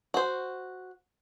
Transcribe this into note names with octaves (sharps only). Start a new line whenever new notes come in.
F#4 C5